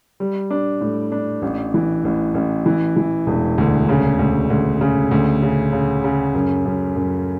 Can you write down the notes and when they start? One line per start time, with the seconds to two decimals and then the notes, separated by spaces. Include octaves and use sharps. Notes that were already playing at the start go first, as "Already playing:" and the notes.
0.20 G3
0.51 D4
0.81 A2
1.12 D4
1.42 A1
1.74 E3
2.05 A1
2.34 A1
2.66 E3
2.96 E3
3.27 E1
3.58 D2
3.89 C#3
4.19 D2
4.50 D2
4.81 C#3
5.11 D2
5.42 C#3
5.73 C#3
6.04 C#3
6.35 F#2
6.65 F#2
6.96 F#2